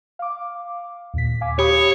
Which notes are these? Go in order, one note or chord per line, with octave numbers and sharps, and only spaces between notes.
F5 D6
D#2 A#2 B6
F5 G#5 D6
G4 C#5 B5 D#6